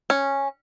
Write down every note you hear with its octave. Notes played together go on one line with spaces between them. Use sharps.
C#4